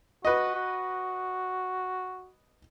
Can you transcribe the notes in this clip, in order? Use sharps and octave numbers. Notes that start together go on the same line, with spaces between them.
F#4 B4 D#5
F#4